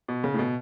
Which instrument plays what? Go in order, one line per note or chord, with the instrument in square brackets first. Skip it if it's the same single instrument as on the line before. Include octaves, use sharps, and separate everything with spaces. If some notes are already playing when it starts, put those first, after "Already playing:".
[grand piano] B2
C#3
A2
B2